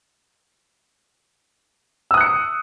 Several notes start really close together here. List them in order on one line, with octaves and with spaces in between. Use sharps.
E6 D#6 F#6 C#7